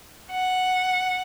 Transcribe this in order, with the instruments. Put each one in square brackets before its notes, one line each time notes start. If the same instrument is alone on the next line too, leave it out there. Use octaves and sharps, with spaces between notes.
[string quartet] F#5